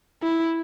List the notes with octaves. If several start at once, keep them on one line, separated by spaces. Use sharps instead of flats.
E4